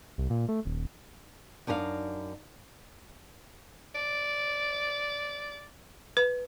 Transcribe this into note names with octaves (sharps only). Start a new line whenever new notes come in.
C2
A#2
A3
D#1
F#2 D4 D#4 A#4 F5
D5
B4